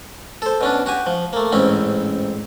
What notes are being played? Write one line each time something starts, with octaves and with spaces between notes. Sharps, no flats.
A4 C5
B2 C#4 D4
F#4 G4 G#5
F3
A3 A#3
A1 G#2 C4 C#4 E4